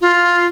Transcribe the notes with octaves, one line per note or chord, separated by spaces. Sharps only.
F4